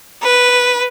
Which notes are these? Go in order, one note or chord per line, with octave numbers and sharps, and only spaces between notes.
B4